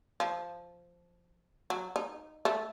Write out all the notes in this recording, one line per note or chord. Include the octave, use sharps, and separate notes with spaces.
F3
F#3
D#4
A3